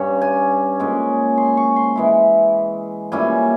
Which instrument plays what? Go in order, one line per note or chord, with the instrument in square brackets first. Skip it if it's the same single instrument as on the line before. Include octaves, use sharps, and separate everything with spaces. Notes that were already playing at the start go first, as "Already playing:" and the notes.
Already playing: [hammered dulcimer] G2 G3 C#4 C#5
G#5
A#2 G#3 C#4
C6
C#6
C6
E3 G#3 E4
A#2 G3 C#4 E4 G#5